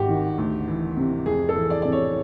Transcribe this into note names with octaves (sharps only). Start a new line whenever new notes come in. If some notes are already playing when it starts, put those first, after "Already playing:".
Already playing: G#1 G#2 F#4 G4
D#3
D2
E3
C3
F2 G#4
A4
E3
D5
C3 D5
C#5